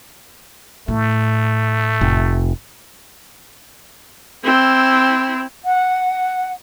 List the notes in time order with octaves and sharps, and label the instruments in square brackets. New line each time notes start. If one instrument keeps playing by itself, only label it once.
[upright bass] A2 [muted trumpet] A3
[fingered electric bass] F1
[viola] C4 E4
[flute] F#5